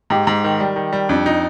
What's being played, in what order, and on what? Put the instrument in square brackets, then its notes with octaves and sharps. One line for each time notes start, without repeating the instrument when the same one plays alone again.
[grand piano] G#2 [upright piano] G4
[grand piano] G#2
D#3
G3
D#3
G3
[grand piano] F2 [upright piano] D4
[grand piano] D#4